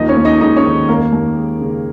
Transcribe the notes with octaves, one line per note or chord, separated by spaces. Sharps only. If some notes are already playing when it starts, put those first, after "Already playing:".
Already playing: D#2 F3 D#4 D#5
C#4 C#5
D#2
D#4 D#5
G#3 D#4 D#5
C#4 C#5
D#3
D#2 A#3 A#4
D#2
G#3
C#3